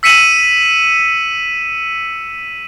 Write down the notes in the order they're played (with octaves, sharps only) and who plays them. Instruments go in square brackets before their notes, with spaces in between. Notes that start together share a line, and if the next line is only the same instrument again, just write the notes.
[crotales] E6 B6 C#7 D#7 E7 F#7